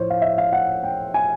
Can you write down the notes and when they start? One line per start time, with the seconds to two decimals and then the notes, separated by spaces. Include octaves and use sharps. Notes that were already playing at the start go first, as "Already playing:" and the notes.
Already playing: A2 F3 C5 C#5
0.10 F5
0.22 E5
0.38 F5
0.53 F#5
0.84 G5
1.14 G#5